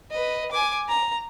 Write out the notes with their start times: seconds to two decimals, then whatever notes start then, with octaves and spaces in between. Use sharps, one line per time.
0.11 B4 D#5
0.52 G#5 D6
0.88 A#5